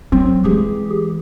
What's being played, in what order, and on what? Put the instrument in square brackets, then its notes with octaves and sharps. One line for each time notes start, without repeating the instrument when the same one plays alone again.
[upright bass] F#3 [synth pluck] C4
[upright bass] E3 G#3 [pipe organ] G4 G#4